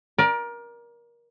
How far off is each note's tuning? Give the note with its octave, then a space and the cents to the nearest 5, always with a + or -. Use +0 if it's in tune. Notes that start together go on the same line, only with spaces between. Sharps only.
A#4 +25 D5 +0